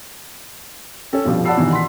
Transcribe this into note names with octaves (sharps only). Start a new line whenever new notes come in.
C#4 A4 G5
G2 B2 F3 G4
D5 F#5 A5 B5 E6 C7
G2 B2 D#3 E3
C6 B6